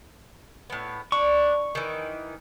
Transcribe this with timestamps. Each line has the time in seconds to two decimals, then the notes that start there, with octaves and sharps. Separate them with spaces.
0.70 A2 B3
1.12 D4 C#6
1.75 D#3 E3